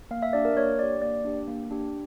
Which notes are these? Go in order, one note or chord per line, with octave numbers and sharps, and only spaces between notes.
A#3 F5
E5
D4 G4 D5
A#4
A#3 C#5
D4 G4 D5
A#3 D5
D4 G4
A#3
D4 G4